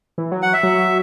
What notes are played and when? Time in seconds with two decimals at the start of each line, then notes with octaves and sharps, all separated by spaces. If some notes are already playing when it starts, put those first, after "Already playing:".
0.18 E3
0.32 F#3
0.42 F#5
0.53 E5
0.63 F#3